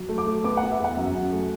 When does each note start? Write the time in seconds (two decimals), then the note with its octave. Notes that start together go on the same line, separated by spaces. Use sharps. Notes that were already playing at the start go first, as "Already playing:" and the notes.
Already playing: F#3
0.09 A3
0.18 D6
0.27 A3
0.44 B3 D6
0.57 B3 F#5
0.71 E5
0.80 E2 F#5
0.97 F#2
1.15 F#2
1.32 A3